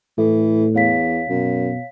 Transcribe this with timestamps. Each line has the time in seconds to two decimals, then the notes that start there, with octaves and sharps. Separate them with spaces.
0.18 A2 E3 A4
0.74 E2 C#5 F5 B6
1.29 F#2 B2